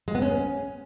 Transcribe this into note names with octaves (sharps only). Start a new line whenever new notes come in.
G#3
B3
C#4